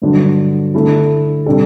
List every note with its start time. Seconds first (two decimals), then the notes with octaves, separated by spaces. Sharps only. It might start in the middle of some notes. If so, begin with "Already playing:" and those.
0.02 G2 D3 F#3
0.75 D3 A3 E4
1.46 C3 G3 D4 A4